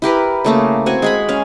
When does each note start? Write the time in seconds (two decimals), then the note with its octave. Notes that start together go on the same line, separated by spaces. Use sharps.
0.02 E4 G4 A#4 B4
0.45 C#3 A3 A#3
0.86 C4 F#4 G#5 C#6
1.02 G#3 G#4 B5
1.29 C#4 F5